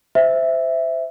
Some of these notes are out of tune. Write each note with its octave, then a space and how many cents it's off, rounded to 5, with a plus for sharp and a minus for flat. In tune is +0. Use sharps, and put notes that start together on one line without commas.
C5 -20 E5 +0